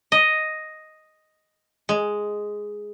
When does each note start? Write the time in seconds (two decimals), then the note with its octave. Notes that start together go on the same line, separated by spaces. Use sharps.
0.12 D#5
1.89 G#3